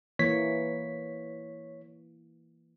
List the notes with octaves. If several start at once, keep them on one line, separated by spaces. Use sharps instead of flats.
E3 A#3 C#5 B6